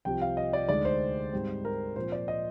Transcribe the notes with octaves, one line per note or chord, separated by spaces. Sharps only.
C2 C3 F3 G5
F5
D#5
D5
D2 D3 G#3 D#4 D5
C5
G#2 G3 C4
A#4
A#2 F3 C4 C5
D5
D#5